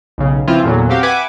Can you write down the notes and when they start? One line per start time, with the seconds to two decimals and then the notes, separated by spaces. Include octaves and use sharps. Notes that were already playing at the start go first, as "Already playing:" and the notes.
0.18 B1 C#3
0.48 C#3 E3 F3 C4 E4 F4
0.64 E2 A#2 D3 F#3
0.89 C4 F#4 G4 F5
1.03 B4 E5 F#5 G#5 D6